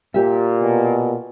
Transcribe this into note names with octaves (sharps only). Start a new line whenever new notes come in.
A#2 G4 E5
B2